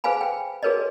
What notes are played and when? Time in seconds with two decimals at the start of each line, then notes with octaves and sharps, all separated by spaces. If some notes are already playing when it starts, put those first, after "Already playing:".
0.04 G#4 B4 C5 F5 G#5 B5
0.21 G5
0.63 F#4 G#4 A#4 B4 C#5 D#5